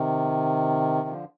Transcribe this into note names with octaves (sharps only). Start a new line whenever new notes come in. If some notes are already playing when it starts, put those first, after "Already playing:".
Already playing: C3 D#3
D3 F3